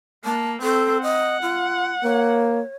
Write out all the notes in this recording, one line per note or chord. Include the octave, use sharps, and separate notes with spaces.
A#3 A5
C4 A4
D#5 F#5
F4
A#3 C#5